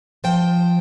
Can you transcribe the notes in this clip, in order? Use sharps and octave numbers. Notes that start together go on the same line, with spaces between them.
F3 C5 G5